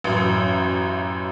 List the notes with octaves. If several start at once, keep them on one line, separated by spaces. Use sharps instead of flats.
A1 F#2